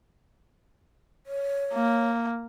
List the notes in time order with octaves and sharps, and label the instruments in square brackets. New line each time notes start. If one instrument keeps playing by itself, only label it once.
[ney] C#5
[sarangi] A#3